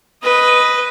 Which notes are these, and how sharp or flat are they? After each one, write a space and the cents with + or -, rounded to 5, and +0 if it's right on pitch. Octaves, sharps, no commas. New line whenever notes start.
B4 +0 D#5 +0